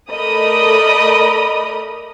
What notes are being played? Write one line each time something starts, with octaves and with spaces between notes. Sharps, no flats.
A3 A#4 D5 D#5 B5 D#6